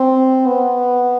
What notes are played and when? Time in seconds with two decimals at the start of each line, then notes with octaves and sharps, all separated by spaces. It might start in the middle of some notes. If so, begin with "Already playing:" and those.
Already playing: C4
0.46 B3